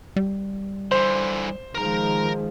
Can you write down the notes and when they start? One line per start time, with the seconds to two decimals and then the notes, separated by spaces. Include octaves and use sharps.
0.16 G3
0.92 D3 E3 C5
1.75 D#3 F3 G#3 A#4 A#5